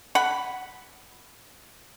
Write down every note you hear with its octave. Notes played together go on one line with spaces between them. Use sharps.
F#5 B5